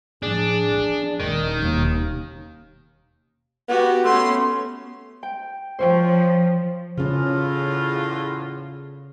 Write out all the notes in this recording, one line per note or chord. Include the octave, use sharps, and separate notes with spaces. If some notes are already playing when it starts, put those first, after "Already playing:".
A2 F3 D4 G#4
E3 B3
D#1 D#3 A#3
D#1 D#2 B2
B3 F#4 G4
A3 B3 C#4 C6
G5
F3 C5 C#5 G5
E2 A2 C#3 C#4 F4